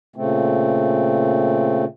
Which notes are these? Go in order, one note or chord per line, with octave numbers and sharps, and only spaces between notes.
A#2 C#3 A3 C4